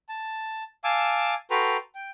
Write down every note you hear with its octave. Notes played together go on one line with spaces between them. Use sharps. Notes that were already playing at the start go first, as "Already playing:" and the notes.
A5
F5 G#5 A5 D6 E6
F#4 A4 B4 G5 A#5 C6
G5